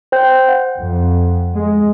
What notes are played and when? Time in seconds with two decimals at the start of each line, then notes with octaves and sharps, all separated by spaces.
0.12 C5 G5 G6
0.49 F#5
0.78 F2
1.55 G#3